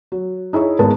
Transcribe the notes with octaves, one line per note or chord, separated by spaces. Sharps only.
F#3
D#4 E4 G#4 C#5 E5
G#1 B3 D#4 G#4 A#4 A5